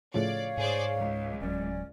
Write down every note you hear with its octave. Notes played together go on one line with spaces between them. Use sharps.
A2 C#3 F3 C#5 D5 F5
G#2 G#4 C5 D5
C#2
D1 F#3 C#4 D5